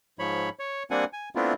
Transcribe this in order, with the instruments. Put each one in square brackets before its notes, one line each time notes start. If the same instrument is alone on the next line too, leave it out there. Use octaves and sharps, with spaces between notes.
[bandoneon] G#2 F3 C#5 B5
C#5
G3 A#3 C4 D4 F#5 G#5
G#5
A3 B3 C4 D4 E4 F4